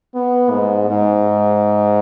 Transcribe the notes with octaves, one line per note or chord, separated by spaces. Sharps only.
B3
G#2
G#2